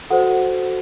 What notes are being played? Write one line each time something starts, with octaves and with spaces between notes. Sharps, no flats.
F#4 A4 C5 F#5